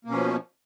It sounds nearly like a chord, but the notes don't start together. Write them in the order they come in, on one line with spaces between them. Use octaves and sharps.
A#3 B2 C#4 F3